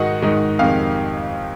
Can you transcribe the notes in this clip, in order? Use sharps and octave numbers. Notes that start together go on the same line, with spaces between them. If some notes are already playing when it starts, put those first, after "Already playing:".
Already playing: G#2 D#3 G#3 D#4 F#4 F#5
G#2 D#3 G#3 D#4
F2 C3 D#3 G#3 F5